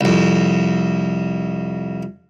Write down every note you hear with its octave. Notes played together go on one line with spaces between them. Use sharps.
C2 F2